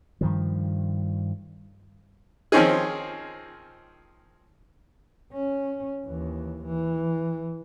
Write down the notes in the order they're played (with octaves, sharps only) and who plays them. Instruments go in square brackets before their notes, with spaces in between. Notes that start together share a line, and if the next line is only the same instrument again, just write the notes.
[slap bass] G2 D#3 F3
[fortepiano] D#3 F3 C4 C#4 D#4 G#4
[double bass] C#4
D#2 E3
E3